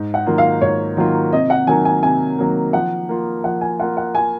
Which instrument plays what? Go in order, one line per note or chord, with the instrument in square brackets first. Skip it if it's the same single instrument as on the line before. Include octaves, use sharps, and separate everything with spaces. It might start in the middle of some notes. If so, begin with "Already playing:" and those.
Already playing: [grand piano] G#2
[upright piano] F#5
[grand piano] D#3 F#3 A#3 F4
[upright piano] F5
[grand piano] G#2 [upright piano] C#5
[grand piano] D#3 F#3 A#3 F4
[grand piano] C3 [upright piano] D#5
[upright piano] F#5
[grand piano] D#3 F#3 A#3 [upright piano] G#5
[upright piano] G#5
[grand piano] C3 [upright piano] G#5
[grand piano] D#3 F#3 A#3
[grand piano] F3 [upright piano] F#5
[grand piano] A#3 F4
[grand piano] F3 [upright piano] F#5
[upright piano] G#5
[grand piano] A#3 F4 [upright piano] F#5
[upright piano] F#5
G#5